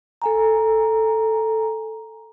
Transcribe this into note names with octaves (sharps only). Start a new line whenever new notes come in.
A4 G#5 A#5